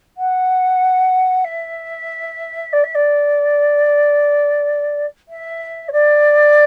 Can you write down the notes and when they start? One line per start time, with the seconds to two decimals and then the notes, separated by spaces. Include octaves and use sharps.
0.17 F#5
1.44 E5
2.73 D5
2.84 E5
2.95 D5
5.29 E5
5.88 C#5
5.92 D5